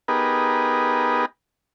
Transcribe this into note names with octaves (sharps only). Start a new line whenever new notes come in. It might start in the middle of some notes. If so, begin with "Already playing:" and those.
B3 D#4 G4 G#4 A#4 B4